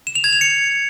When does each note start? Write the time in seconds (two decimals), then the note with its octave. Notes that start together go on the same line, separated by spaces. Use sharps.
0.07 E7
0.15 F7
0.24 G#6
0.33 F7
0.41 C#7